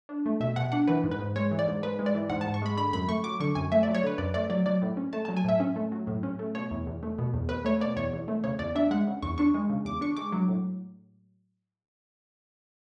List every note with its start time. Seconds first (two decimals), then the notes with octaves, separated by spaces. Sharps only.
0.09 D4
0.26 A3
0.40 B2 E5
0.56 B2 F#5
0.72 D4 F#5
0.88 E3 B4
1.04 G#2
1.11 B4
1.20 G#2
1.36 G#3 C#5
1.51 E3
1.59 D5
1.67 G#2
1.82 G#2 B4
1.99 G#3
2.06 D5
2.15 E3
2.30 G#2 F#5
2.41 A5
2.45 G#2
2.54 C#6
2.62 G#3 B5
2.77 D3 B5
2.93 F#2 B5
3.08 A3 C#6
3.24 F#3 D6
3.40 D3 C#6
3.55 F#2 G#5
3.72 A3 E5
3.83 D5
3.88 F#3
3.95 C#5
4.03 D3 B4
4.18 F#2 D5
4.34 A3 D5
4.50 F#3 D5
4.66 F#3 D5
4.82 A2
4.97 C#4
5.13 A3 A5
5.25 A5
5.29 F#3
5.37 G#5
5.44 A2 E5
5.60 C#4
5.76 A3
5.92 F#3
6.07 A2
6.23 C#4
6.39 A3
6.55 B2 C#5
6.71 E2
6.87 E2
7.03 A3
7.19 B2
7.34 E2
7.49 E2 B4
7.65 A3 C#5
7.81 B2 D5
7.96 E2 C#5
8.13 E2
8.28 A3
8.44 C#3 C#5
8.59 E2 D5
8.75 D4 E5
8.91 G#3 F#5
9.07 C#3
9.23 E2 C#6
9.38 D4 C#6
9.54 G#3
9.70 C#3
9.85 E2 D6
10.01 D4 C#6
10.17 G#3 D6
10.32 F#3
10.48 A2